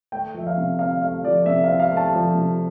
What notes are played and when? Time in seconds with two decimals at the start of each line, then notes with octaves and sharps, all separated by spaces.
0.12 A3 G5
0.34 F3 E5
0.47 F5
0.57 C3
0.79 C4 F5
1.02 A3 F5
1.24 F3 D5
1.46 C3 E5
1.64 F5
1.68 C4
1.80 F5
1.92 A3
1.97 A5
2.13 F3 A5
2.35 C3